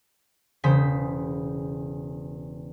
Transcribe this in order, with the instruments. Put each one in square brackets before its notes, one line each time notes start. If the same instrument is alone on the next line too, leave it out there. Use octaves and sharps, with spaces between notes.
[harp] E1 C#3 C5 B6